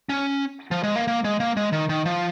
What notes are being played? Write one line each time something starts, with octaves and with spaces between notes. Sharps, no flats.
C#4
F3
G#3
A#3
A#3
G#3
A#3
G#3
D#3
D#3
F3